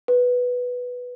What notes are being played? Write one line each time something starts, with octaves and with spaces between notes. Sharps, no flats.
B4